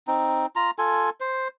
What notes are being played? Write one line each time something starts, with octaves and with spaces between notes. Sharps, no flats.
C4 D#4
F4 A#5
F4 A4 G#5
C5